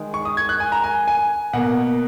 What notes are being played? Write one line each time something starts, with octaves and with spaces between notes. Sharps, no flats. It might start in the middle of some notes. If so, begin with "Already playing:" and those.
Already playing: D#3 G#3
C#6
D#6
G#6
F#6
G#5
A#5
G#5
G#5
B2 A#3 F#5